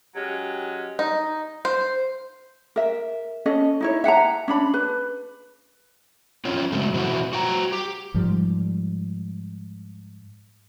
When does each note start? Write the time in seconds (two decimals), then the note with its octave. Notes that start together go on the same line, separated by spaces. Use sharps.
0.16 F#3 G#3 C#4 G4
0.99 D#4
1.65 C5
2.76 A#4 E5
3.46 C#4 A4 D#5
3.81 D#4 E4 C#5
4.04 E5 F#5 G5 A#5
4.48 C#4 D4 B5
4.74 B4
6.45 C4 C#4 F4
6.72 C#3 F#3 G#3 A3
6.94 B2 E3 C4 E4 F#4
7.33 F#4 G5 A#5
7.72 G4
8.14 G#2 F3 G3